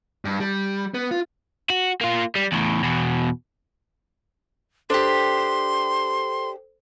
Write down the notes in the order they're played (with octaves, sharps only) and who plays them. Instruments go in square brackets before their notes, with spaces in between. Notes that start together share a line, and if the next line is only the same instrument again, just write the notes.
[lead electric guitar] G2
G3
B3
F4
[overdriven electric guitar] F#4
A#3 F4
G3
E2 A2
E2 B2
[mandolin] D4 G4 [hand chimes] A4 C5 [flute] C6